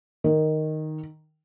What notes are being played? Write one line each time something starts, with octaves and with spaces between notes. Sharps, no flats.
D#3